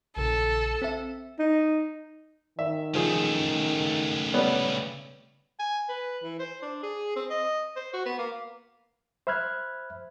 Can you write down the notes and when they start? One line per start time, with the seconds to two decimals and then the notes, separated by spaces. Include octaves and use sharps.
0.17 A#1 C#3 A4
0.82 C4 E5
1.39 D#4
2.59 D#3 E5
2.95 C#3 F3 A3 G#4
4.34 G3 B3 C#4
5.60 G#5
5.89 B4
6.23 E3
6.39 C5
6.62 D4
6.83 G#4
7.16 C4
7.30 D#5
7.76 C5
7.93 F#4
8.06 B3
8.18 A#3
9.27 C5 E5 B5 F6 F#6 G#6